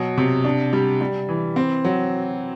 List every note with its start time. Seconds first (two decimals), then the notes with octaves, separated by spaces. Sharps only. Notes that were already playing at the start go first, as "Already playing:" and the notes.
Already playing: B2 F#3
0.18 C3
0.44 D4
0.73 G3
1.01 G3
1.29 E3
1.56 C4
1.84 F#3